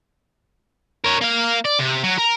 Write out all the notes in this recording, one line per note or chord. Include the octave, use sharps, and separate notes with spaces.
A#4 C#5
A#3 F5
D5
C3
F#3
A#4